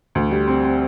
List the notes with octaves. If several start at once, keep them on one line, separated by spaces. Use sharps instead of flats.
D2
G3
C4
C4